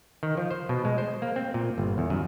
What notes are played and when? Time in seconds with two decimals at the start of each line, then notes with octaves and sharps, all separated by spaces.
0.23 D#3
0.37 F3
0.50 C5
0.69 B2
0.85 G#3
0.98 C5
1.22 A#3
1.36 C4
1.54 A#2
1.78 G1
1.98 E2
2.10 F#2